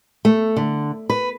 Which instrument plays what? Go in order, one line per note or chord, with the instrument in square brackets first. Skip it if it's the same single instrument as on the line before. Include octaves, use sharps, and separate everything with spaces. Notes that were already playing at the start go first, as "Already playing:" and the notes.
[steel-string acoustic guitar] A3
D3
B4